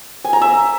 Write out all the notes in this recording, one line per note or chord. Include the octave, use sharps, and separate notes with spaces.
G#5
A#5
E5